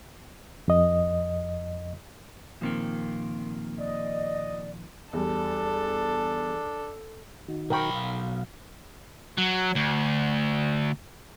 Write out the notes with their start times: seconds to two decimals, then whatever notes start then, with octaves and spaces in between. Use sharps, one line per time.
0.68 F2 D#5
2.61 A#2 D#3 F3 A#3 C4
3.79 D5 D#5
5.13 E2 G3 D4 A4
7.48 D#3 D#4 F#4
7.70 B1 A#4 G5 B5 C#6
7.94 F5
9.38 F#3
9.75 D2